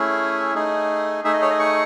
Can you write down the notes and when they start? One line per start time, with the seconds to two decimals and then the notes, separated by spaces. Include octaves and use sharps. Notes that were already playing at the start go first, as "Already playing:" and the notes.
Already playing: A3 C#4 E4 G#4
0.55 A3 D#4 G#4
1.24 A3 D#4 G#4 E5
1.33 D#5
1.42 C#5
1.50 D#5
1.59 C#6